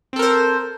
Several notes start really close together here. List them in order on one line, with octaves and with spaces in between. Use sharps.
C4 A4 A#4 C5